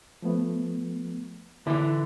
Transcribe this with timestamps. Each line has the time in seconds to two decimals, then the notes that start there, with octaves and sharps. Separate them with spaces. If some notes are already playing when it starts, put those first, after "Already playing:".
0.22 F3 A3 B3
1.67 D3 E3 E4